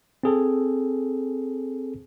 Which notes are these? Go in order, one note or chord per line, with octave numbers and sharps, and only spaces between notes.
C4 G#4 A4